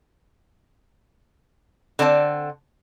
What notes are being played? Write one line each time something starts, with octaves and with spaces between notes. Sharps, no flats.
D3 C4 D5 A5